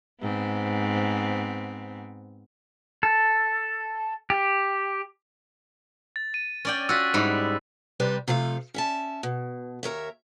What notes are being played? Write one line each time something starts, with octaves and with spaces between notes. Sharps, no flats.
G#2 B3 C4
A4
G4
A6
D#7
C#4 D5 G5
F4 F#4 E6 F#6 B6
G#2 G3 E4
C3 G3 B4 C5
C3 F3 A3 F5
C#4 E5 A5
B2
D#2 A#4 C#5 E5